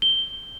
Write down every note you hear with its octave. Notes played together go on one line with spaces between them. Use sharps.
G7